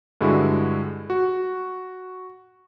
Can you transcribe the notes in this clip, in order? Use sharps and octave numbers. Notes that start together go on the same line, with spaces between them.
G2 D3 G#3 E4 F#4
F#4